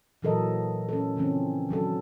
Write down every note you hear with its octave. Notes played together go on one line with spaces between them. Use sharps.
A#2 E3 F#3 A4 A#4 D#5
C#4 A4
C#3 E3 F3 C4 C#4
D#3 F#3 D4 A4